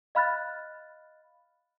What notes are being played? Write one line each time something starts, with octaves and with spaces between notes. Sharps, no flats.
D#5 F5 B5 F6 F#6 A6